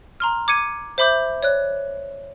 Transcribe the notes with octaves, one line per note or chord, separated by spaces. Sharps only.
A#5 C6 F6
D6 G#6 C#7 D#7
C5 E5 B5 D6 G6
C#5 D5 F#6